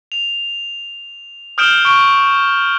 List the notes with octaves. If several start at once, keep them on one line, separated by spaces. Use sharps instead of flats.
F7
D#6 F6 G6 D7 E7 G7
C#6 D7